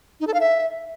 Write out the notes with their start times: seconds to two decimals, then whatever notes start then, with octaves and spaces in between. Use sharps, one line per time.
0.20 D#4
0.27 A4
0.34 F5
0.41 E5